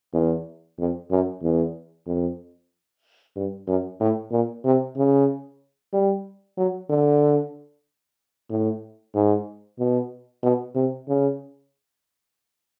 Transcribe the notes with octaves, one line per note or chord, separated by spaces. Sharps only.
E2
F2
F#2
E2
F2
G2
F#2
A2
A#2
C3
C#3
G3
F#3
D3
A2
G#2
B2
B2
C3
C#3